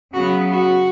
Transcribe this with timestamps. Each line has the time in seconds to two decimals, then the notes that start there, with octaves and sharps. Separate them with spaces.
0.14 C#3 F#3 B3 F#4
0.50 F#4